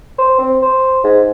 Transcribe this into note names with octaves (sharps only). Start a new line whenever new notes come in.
C5
C4
C5
G#2